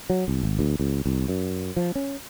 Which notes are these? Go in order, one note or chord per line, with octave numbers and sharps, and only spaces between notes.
F#3
C2
G#1
D2
C#2
C2
F#2
F3
C#4